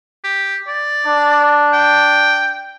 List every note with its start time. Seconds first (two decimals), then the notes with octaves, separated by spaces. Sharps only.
0.24 G4
0.68 D5
1.06 D4
1.73 G5